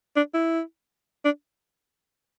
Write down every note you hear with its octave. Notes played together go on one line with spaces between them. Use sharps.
D4
E4
D4